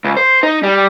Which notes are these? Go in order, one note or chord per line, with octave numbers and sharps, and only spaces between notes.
C#2
C5
D#4
G3